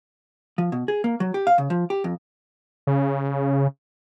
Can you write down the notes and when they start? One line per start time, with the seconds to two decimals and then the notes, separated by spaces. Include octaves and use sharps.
0.58 F3
0.72 B2
0.88 G#4
1.04 A#3
1.20 F#3
1.34 G4
1.47 F5
1.58 C#3
1.70 F3
1.90 G4
2.04 F2
2.87 C#3